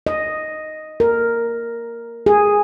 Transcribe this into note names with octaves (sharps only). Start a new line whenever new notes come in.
D#5
A#4
G#4